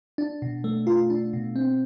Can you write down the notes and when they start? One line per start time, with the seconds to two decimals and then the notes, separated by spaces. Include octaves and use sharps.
0.18 D4
0.42 B2
0.64 A3
0.87 F4
1.10 D4
1.33 B2
1.56 C4